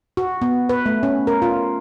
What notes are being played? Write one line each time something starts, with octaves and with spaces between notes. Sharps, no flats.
F#4
B3
B4
A3
C#4
A#4
F4